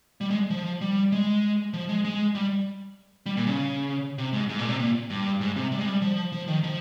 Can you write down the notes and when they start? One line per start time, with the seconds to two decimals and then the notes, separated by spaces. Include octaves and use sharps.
0.21 G3
0.30 G#3
0.50 F3
0.81 G3
1.12 G#3
1.73 F3
1.89 G#3
2.04 G#3
2.35 G3
3.26 G3
3.37 A#2
3.47 C#3
4.18 C3
4.33 G#2
4.49 G#2
4.59 A#2
4.69 C3
4.80 A#2
5.10 G2
5.41 G#2
5.56 C3
5.72 G3
5.79 G#3
5.86 G3
6.02 F3
6.32 F3
6.48 D#3
6.64 F3